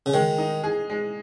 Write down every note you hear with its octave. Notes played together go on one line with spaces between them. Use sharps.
C#3
D#3 G#3
D#4
G#4
G#3